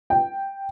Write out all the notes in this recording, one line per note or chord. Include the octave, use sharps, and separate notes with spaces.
G5